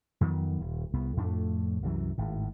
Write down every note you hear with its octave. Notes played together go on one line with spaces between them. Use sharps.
F2 D#3 F#3 B3
D#1
C2 B3
F2 A2 A3 D4
C2 F#2 E3 F#3
G#1 A2